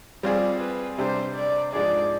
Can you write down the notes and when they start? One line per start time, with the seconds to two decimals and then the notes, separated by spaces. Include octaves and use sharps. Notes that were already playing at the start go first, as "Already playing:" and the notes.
0.23 G3 C4 F4 G#4 D5
0.61 B4
0.98 C3 G3 D4 G4 C5
1.36 D5
1.73 G#2 F3 G#3 D4 G#4 D5